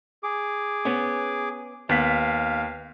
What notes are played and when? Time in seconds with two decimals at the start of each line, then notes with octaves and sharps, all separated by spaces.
0.23 G#4 D6
0.85 B3 C#4
1.89 D#2 B3 F5 B6